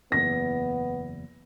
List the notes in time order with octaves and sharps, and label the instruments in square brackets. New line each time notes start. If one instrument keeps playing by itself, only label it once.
[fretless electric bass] F#1 E2 [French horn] B3 [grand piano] A#6